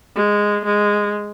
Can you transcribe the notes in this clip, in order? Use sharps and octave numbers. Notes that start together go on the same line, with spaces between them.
G#3
G#3